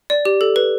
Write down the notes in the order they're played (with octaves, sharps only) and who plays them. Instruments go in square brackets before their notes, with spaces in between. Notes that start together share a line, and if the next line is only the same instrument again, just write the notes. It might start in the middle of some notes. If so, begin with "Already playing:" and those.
[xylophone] D5
G4
A4
B4